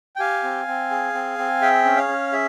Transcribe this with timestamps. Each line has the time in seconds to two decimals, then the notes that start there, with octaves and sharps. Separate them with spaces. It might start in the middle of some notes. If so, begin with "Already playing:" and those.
0.16 G5
0.19 G4 F5 G#5
0.43 C4
0.68 C4
0.91 G#4
1.14 C4
1.39 C4
1.61 G#4 E5 G5
1.85 C#4
1.97 C#5 F5
2.08 C#4
2.32 G#4 E5